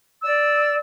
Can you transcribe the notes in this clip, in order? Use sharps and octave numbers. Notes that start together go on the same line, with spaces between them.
D5 E6